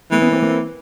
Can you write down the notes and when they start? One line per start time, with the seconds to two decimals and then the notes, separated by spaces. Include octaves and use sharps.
0.11 E3 A3 B3
0.22 B3 C#4
0.32 A#3 C4
0.42 A#3 C4